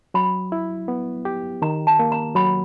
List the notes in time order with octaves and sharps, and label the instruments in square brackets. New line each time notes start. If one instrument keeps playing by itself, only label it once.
[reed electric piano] F#3 [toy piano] B5
[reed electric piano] E4
B3
G4
[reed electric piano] D#3 [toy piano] A#5
[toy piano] A5
[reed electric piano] A#3
[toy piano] A#5
[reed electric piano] F#3 [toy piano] B5